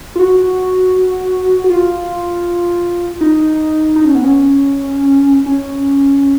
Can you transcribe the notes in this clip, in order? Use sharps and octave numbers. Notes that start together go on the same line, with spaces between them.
F4
F#4
F#4
F4
D#4
D#4
C#4
B3
C#4
C#4